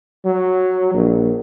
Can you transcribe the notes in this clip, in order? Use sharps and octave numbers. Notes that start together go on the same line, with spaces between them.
F#3
A#1